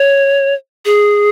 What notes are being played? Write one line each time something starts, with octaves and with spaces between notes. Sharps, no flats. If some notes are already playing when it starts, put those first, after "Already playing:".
Already playing: C#5
G#4